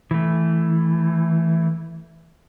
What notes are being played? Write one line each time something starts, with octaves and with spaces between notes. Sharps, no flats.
E3 A3